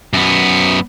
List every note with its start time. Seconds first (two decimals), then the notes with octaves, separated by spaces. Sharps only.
0.13 F#2 B3